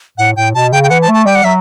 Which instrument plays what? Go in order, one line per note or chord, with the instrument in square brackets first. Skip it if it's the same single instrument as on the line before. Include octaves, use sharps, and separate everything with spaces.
[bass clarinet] A2 [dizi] F#5
[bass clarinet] A2 [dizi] G5
[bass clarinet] B2 [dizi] A5
[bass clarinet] C#3 [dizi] G5
[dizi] G5
[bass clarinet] E3 [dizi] F#5
[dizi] A5
[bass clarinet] A3
[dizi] A5
[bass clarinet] G3 [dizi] G5
[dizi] F#5
[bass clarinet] F#3 [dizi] E5